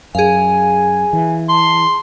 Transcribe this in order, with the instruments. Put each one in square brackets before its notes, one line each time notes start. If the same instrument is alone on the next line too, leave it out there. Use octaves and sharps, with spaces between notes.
[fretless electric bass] F#2 [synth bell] G#4 F5 [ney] G#5
[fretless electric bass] E3
[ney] A5 [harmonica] C6